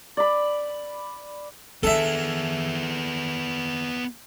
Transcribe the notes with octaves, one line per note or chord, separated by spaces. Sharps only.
D5 B5
D#3 B3 D4 G#4 A4 E5